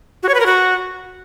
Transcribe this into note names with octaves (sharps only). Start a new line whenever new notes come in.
F#4
C#5
B4
A#4
F#4